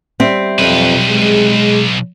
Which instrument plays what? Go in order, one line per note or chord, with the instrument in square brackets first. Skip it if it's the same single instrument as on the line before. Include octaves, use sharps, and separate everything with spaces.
[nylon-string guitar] G3 C4 E5
[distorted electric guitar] B1 B4 [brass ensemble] F2
[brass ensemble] G#3 G#4